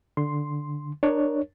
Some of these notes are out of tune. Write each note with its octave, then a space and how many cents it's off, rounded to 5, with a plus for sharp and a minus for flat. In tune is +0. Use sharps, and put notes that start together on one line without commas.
D3 +0 C6 +0
D4 +20 A#4 +10 C#5 +0